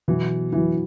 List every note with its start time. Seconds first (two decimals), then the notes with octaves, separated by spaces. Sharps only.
0.08 B2 E3 F#3 B3 E4
0.52 B2 E3 F#3 B3 E4